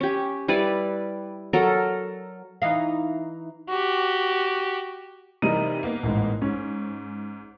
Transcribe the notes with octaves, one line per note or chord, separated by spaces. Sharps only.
C#4 G4
G3 E4 B4 D5
F#3 A4 A#4 A#5
E3 D#4 F5
F#4 G4
C3 E3 G3 D#4 A#4 D#7
A#3 B3 D#4
A1 G#2
G#2 C#4